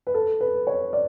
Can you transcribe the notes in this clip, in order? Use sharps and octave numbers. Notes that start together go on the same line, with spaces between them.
B4
A4
B4
C#5
D5